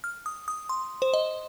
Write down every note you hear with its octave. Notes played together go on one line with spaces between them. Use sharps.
F6
D#6
D#6
C6
C5
D#5